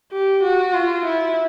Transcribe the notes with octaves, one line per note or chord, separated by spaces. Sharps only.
G4
F#4
F4
E4